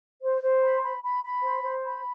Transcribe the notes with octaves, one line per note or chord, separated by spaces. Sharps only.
C5
C5
B5
B5
B5
B5
C5
C5
B5